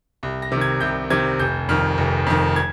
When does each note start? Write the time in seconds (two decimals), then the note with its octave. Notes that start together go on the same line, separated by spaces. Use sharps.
0.23 C2
0.42 A#6
0.52 C3 D#3
0.61 G#6
0.80 C2 G6
1.10 C3 D#3 G#6
1.39 F1 G6
1.69 F2 D#3 F6
1.98 F1
2.26 F2 D#3
2.56 G#6